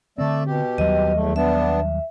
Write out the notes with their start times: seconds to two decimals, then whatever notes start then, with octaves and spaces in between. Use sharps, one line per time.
0.18 D3 A3 C4 D5 E5
0.46 B2 G4
0.78 D#2 F#3 G3 D#5
1.14 E2 A3
1.36 B3 D4 E5